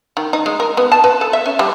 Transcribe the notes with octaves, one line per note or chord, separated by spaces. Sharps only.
D#3
D#4
G#3
A#4
B3
A5
B4
A4
E5
C#4
G3